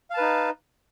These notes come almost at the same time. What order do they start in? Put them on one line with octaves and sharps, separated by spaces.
F5 A5 B4 D#4